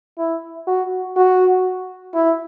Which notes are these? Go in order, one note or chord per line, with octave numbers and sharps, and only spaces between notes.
E4
F#4
F#4
E4